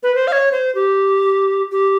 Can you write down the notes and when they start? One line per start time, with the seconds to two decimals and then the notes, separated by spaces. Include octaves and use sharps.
0.03 B4
0.15 C5
0.27 F5
0.32 C#5
0.52 C5
0.75 G4
1.72 G4